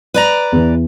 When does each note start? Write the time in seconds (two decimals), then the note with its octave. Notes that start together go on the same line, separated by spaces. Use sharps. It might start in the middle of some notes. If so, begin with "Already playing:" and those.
0.14 B4 D5 A#5
0.52 E2 E3